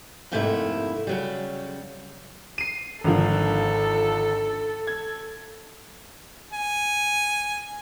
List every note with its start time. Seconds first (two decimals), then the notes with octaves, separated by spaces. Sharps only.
0.32 F2 G#2 C3 A3 A#3 E4
1.07 C#3 F#3 G3
2.58 C7 D#7
3.04 G#1 D3 F3 A4
4.87 G#6
6.53 G#5